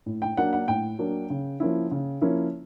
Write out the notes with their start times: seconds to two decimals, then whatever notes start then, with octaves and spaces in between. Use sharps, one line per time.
0.06 A2
0.22 G5
0.37 F#3 A#3 D4 F#5
0.53 F#5
0.68 A2 G5
0.99 F#3 A#3 D4
1.30 C#3
1.60 F3 A#3 C#4 E4
1.91 C#3
2.21 F3 A#3 C#4 E4